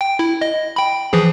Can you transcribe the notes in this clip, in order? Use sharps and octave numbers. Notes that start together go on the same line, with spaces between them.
G5
E4
D#5
G5 B5
E3 F3 G#4